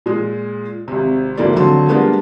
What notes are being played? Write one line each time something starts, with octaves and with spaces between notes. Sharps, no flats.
A#2 G#3
G#1 C3
D2 G#2 E3 A#3 D5
G#1 D3 F#3 A5 C6
G3 G#3 A#3 B3 D4 F4